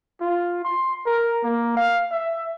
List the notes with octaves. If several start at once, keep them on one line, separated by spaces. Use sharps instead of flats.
F4
C6
A#4
A#3
F5
E5